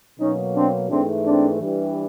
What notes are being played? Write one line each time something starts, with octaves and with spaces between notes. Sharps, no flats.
B2 F#3 A#3 C#4 D#4
C4 D4
G#2 E3 A3 C4 D4
C4 D4
G2 E3 G3